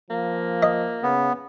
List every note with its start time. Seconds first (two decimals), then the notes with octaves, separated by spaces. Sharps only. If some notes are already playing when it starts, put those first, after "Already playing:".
0.11 F3 A#3
0.63 D#5
1.03 C#3 B3